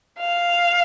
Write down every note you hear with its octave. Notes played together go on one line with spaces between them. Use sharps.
F5